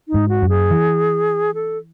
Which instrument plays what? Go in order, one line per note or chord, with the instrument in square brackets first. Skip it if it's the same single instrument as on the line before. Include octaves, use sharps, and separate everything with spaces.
[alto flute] D#4
[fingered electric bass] G#2
[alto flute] F#4
[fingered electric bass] F#2
[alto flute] G#4
[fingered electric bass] E3
[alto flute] A4